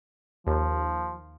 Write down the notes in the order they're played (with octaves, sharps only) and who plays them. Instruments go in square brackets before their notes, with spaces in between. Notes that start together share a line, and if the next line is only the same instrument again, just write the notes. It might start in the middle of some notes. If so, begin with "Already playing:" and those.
[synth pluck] D#2 [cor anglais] F3